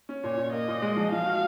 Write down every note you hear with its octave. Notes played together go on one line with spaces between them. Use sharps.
C#4
A#2 C#5
A#2
A#3 D#5
A#2
G#3
F3
F3 F5
F#4